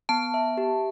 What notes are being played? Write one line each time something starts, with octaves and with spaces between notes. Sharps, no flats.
B3 A5
E5
G4